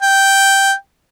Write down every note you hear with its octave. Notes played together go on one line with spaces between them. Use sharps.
G5